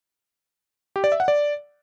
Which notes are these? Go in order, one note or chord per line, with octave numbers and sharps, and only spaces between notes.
G4
D5
E5
F#5
D5